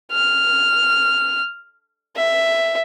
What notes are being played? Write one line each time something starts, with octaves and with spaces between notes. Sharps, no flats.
F6
E5